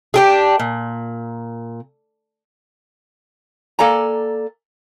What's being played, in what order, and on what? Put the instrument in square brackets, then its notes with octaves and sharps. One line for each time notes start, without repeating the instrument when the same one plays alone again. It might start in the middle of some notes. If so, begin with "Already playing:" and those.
[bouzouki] D4 G4 G#4
A#2
[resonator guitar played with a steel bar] A#3 A4 D5 G#5 A#5